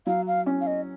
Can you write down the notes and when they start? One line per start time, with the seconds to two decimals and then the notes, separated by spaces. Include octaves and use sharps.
0.07 F#3 F5
0.27 F5
0.46 C#4
0.61 F5
0.67 D#5